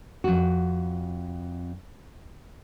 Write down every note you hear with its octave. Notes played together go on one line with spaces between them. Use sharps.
F2 F#4